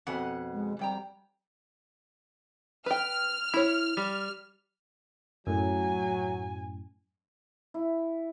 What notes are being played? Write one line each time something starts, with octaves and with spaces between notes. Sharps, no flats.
F2 B2 F#5 G#5
G#3
F2 G3 G5 A#5
B4 G5 F6
E4 C#5
G3
F#2 A2 F#3 G#5
E4